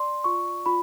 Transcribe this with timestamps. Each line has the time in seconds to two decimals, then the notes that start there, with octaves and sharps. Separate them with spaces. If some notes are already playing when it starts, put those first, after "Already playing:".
Already playing: D5 C6
0.24 F4 C#6
0.66 F4 B5